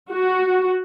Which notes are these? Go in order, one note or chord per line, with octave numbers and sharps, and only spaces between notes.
F#4